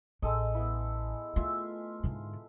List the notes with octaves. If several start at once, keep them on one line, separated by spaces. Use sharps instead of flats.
A1 G#3 A4 D#5
B3 E4
A3 F4 E5
G#2 D3